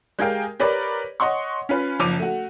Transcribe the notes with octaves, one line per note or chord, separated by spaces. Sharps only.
G#3 G4 G#4 A#4 F5 G5
G4 A#4 B4 C#5 D5
C#5 D#5 F#5 C6 C#6
C#4 F4 B4
F#1 F3 D6 D#7 F7
A3 F#4